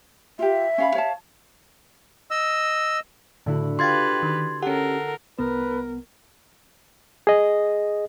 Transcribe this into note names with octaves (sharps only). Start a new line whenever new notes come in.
F4 G4 E5
C#4 F5 B5
C#5 F5 A5
D#5 E6
A2 D3 E4 F#4
F4 G4 B4 F5 G5 C6 G#6 A6
D#3
C#4 G4 A4 A#4 F#5
C2 B3 A#4 B4
G#4 D#5